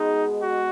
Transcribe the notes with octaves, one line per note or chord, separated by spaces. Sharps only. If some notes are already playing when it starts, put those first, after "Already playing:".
Already playing: B2 G#3 B3 D#4 G#4
F#4